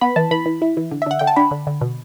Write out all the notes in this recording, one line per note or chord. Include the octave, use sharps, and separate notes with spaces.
B3 B5
E3 A5
E3 B5
E3
E4
E3
D3
E5
D3 F#5
D3 G5
A5
D4 B5
D3
D3
B2